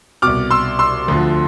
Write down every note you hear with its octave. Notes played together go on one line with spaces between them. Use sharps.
C2 B2 D6 F6
C6 E6
C6 E6
D2 D3 F3